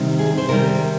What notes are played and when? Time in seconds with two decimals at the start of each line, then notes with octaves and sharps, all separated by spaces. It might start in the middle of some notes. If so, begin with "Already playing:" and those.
Already playing: C3 D#3 G3
0.19 G#4
0.38 C5
0.48 C3 D#3 G3 A#4